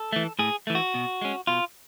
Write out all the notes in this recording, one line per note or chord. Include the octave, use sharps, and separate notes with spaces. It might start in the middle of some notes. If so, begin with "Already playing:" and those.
Already playing: A4
E3 A3
A2 G#4
E3 A3
F#4
B2
G#3 C#4
B2 F4